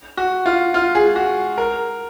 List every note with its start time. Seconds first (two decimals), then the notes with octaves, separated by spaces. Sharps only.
0.17 F#4
0.46 F4
0.74 F4
0.95 G#4
1.16 F#4
1.58 A#4